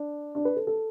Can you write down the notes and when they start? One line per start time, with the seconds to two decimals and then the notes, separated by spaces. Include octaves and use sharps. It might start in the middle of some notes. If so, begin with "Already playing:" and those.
Already playing: D4
0.35 D4
0.45 B4
0.56 A4
0.67 A4